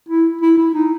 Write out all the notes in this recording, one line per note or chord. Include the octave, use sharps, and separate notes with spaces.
E4
E4
E4
D#4